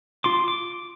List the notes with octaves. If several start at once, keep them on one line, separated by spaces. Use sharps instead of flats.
F4 C6 D6
D6